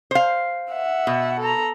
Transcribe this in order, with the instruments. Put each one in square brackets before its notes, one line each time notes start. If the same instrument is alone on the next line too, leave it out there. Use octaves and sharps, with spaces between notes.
[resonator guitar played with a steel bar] C5 F5
[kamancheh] E5 F#5
[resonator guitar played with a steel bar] B2
[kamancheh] A4 A#5